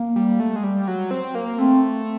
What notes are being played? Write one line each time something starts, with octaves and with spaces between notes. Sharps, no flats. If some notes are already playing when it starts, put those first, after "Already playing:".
Already playing: A#3
G3
A3
G#3
G3
F#3
C4
A#3
A3 C4